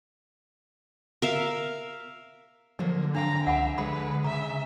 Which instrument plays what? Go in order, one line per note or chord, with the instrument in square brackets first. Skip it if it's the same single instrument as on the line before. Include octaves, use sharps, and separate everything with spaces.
[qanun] A#4 E5 F5
[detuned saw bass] D3 [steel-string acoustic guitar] F3 F#3 A#3
[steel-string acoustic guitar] F2 F5 G5 [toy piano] D4 [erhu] A#5
[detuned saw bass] C#2 [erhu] E5 [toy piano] F#5 G#5 B5
[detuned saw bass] D3 [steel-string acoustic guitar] G#3 G#4 F#5 [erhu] B4 [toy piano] B5
[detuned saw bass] C#3 [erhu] E5 [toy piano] A#5